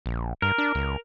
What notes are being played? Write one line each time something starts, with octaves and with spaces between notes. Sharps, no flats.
A#1
G2 A#4
D4
C#2